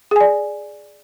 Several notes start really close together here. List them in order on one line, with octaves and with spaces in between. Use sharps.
G#4 G#5 D5